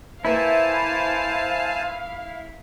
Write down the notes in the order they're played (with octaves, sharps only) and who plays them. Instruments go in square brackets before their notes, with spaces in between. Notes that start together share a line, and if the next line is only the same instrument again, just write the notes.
[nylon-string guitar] A#3 B4 E5 [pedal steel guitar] E4 [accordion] C5 G#5 A5 [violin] F5